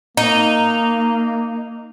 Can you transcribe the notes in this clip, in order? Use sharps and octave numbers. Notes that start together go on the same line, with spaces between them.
A#3 D#4